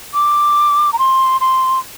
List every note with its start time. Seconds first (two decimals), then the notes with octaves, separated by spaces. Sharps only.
0.14 D6
0.93 A#5
0.99 C6
1.41 C6